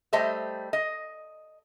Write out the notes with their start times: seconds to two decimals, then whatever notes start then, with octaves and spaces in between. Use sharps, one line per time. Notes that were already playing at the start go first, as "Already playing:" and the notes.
0.13 G3 A3 C5 D#5 E5
0.73 D#5